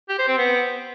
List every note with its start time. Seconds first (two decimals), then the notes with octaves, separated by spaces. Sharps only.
0.09 G4
0.19 C5
0.28 C4
0.38 B3